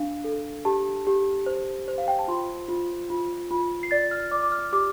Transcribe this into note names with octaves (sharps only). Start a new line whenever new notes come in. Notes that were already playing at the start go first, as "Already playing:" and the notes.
Already playing: D4 F5
A4
G4 A5
G4
C5
C5
F5
G5
A5
F4 C6
F4
F4
F4
C7
D5 A6
F6
D5 D6
D6
F6
G4 D6